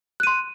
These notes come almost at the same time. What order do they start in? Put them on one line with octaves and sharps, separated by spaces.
F#6 D#7 C6